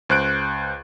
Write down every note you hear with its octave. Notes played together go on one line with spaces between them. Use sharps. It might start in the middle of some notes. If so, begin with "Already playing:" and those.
C#2 C5 F#6 D7